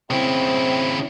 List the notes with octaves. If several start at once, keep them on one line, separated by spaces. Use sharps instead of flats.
C#3 C4 E4